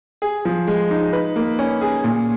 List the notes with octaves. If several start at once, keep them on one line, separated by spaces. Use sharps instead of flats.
G#4
F3
G#3
D#4
B4
A#3
C#4
G#4
A#2